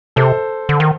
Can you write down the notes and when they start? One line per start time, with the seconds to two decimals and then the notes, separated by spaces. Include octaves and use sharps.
0.16 C3 A4 C5
0.69 D3
0.80 D#3